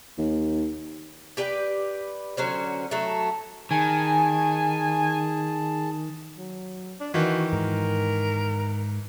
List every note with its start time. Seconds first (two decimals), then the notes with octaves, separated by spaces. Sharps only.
0.18 D#2
1.37 G4 B4 D5 G5
2.37 D3 F#3 C#4 C5
2.91 F#3 A3
3.71 D#3 G#4 G#5 A5
6.38 F#3
7.00 D4
7.14 D#3 E3 F#4
7.53 G#2 A#4